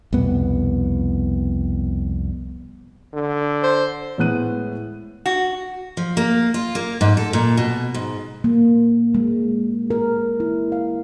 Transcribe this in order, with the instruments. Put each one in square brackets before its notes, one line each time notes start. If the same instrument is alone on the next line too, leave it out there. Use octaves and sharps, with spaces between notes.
[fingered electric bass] C2 F2 B2 B3
[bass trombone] D3
[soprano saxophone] C5
[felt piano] A2 G#3 B3 F#6 D#7
[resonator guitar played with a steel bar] F#4
[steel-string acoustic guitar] F3
A#3
F4
A#3
G#2
A4
A#2
B2
G#2
[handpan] A#3
G#3
A#4
E4
F5